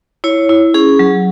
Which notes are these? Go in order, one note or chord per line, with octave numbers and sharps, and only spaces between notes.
E4 C#5
E4
C#4 G#4
F#3